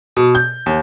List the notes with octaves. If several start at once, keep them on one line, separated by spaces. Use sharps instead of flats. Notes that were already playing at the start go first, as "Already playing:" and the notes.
B2
G6
D#2